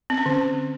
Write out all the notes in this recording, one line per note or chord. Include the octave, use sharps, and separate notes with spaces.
C4
C#4
D3